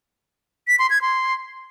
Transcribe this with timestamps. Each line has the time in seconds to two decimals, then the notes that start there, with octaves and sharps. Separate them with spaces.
0.68 B6
0.79 C6
0.90 G#6
1.02 C6